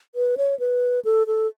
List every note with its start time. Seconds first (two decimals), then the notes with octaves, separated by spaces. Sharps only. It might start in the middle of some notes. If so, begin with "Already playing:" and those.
0.15 B4
0.37 C#5
0.60 B4
1.05 A4
1.27 A4